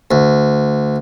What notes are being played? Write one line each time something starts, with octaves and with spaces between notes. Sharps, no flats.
D2